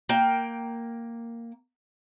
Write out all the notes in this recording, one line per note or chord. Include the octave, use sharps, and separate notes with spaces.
A#3 G5